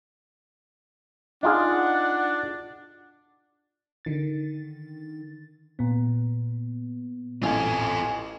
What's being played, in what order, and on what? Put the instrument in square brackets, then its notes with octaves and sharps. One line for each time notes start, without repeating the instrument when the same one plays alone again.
[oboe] D4 [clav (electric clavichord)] D#4 F4 G#4 [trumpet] F#5
[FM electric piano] D3 D#3 A6
A#2 B3
[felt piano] A1 [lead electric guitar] F4 A4 [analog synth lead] G#5